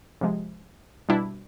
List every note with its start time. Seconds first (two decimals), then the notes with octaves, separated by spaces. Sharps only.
0.21 C3 F3 G#3
1.09 B2 G3 D4 E4